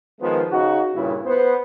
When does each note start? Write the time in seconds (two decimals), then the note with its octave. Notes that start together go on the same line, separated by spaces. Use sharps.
0.21 D#3 F3 G#3 B3
0.51 C#3 D#4 F#4
0.95 G2 A#2 C#3 E4
1.25 B3 C5